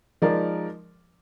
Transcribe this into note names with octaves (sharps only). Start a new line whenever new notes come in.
F3 G#3 D#4 A#4 D5